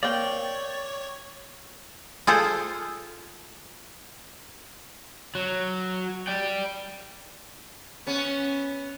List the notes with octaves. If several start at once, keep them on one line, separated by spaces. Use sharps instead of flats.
A#3 C4 C#5 D5 G5
F4 G#4 A4 C5
F#3
D5 G5
B3 C#4